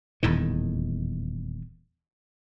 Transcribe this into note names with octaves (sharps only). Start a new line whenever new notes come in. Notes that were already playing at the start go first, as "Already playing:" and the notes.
D#1 E2 A2 D#3